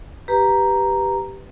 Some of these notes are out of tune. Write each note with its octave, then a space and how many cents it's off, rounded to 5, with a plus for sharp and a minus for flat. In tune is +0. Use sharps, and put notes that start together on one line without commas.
G4 +0 B4 -5 A#5 +0